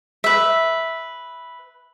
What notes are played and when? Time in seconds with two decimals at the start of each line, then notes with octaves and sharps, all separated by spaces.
0.24 B4 E5